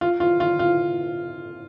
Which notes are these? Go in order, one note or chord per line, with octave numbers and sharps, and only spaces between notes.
F4
F4
F4
F4